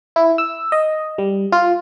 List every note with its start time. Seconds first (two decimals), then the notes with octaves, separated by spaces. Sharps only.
0.16 E4
0.38 E6
0.72 D#5
1.18 G3
1.52 F4